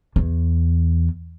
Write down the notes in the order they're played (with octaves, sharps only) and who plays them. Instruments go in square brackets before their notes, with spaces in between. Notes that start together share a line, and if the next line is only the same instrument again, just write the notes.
[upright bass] E2